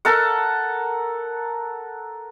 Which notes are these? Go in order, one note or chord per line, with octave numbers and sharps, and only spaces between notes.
A4 A#4 F#5